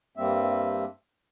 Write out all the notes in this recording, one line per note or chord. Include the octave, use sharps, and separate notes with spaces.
G2 G3 A#3 C4 E5